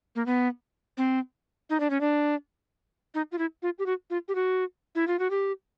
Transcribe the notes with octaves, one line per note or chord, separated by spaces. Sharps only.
A#3
B3
C4
D#4
D4
C#4
D4
D#4
F4
E4
F4
G4
F#4
F4
G4
F#4
E4
F4
F#4
G4